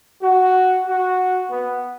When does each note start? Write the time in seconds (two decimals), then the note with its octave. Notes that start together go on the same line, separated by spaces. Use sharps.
0.22 F#4
0.87 F#4
1.50 B3